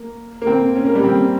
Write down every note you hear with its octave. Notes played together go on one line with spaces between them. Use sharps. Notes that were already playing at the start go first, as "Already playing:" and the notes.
Already playing: A#3
A#3
C4
C#4
A#3
G3
C4